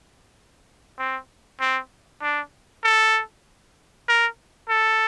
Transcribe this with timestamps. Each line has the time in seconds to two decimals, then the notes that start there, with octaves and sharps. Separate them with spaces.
0.99 C4
1.60 C4
2.22 D4
2.84 A4
4.08 A#4
4.69 A4